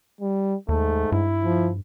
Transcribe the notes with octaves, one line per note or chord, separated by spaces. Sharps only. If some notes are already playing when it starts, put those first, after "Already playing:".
G3
D#2 G#2 A3
G2 E4
F3